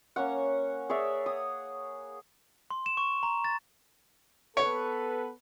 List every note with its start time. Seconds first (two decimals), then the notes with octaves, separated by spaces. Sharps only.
0.16 A#3 C#4 C#5 F#5
0.89 G#4 C#5 D5 E5
1.26 D#6
2.70 C6
2.86 E7
2.97 C#6
3.23 A#5
3.44 A6
4.57 B3 A4 B4 C#5